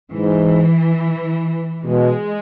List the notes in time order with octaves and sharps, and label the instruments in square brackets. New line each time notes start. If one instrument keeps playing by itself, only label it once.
[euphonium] G#2 [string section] E3
[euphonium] B2 [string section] G#3